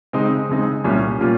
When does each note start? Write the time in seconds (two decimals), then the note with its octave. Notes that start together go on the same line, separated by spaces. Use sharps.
0.13 C#3 G#3 C4 D#4
0.49 C#3 G#3 C4 D#4
0.84 C2 A#2 G3 C#4 F4
1.20 A#2 G3 C#4 F4